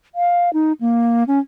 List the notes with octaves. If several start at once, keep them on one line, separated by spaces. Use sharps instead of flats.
F5
D#4
A#3
C#4